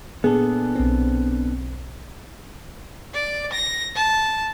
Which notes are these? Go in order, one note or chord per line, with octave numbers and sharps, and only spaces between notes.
A#2 B3 D4 G#4 A4
B1 C4
D5
A#6
A5